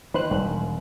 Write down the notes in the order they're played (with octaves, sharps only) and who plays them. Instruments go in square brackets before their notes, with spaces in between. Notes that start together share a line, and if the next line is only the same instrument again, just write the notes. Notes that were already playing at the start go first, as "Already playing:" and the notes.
[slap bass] D#3 [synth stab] B4 C5 F#6
[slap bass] E1 [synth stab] D#3 G3